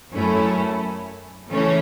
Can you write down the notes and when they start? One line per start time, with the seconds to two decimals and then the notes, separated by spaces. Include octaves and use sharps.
0.12 F#2 F#3 A3 C#4 E4
1.49 C#3 E3 A3 C#4